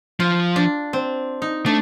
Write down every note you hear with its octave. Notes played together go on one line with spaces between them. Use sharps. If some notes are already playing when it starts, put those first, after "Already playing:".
F3 F4
D4
C4
D#4
A3 D4